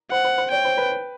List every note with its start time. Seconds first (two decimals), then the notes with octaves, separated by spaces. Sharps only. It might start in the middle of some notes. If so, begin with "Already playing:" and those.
0.11 C5 F#5
0.24 C5
0.38 C5
0.51 C#5 G5
0.65 C5
0.78 B4